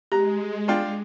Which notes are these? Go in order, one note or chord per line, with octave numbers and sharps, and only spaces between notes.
G#3 G4 A#5
D4 F4 G5